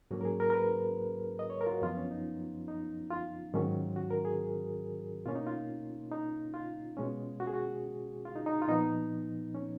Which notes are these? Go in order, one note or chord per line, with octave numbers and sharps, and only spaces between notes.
G#2 F#3 A#3 C#4 F#4
A#4
G#4
A#4
A#4
B4
D#5
C#5
A#4
F4
F#4
F#2 F3 B3 F4
C#4
D#4
D#4
F4
G#2 D#3 F#3 C#4
F#4
A#4
G#4
B2 A#3 C#4 F4
D#4
F4
D#4
F4
B2 G#3 C#4
F#4
G#4
F#4
F4
D#4
D#4
F4
A#2 F3 B3 D#4
C#4